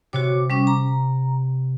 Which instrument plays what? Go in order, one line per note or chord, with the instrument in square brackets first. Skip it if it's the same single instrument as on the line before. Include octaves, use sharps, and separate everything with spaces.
[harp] C3 [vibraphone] F#4 C#5 D6
[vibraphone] G3 C#4 D6
A#5